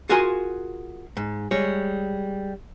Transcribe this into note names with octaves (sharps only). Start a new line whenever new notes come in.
F4 F#4 G#4 A#4 G#5 C6
G#2
G3 G#3 C#5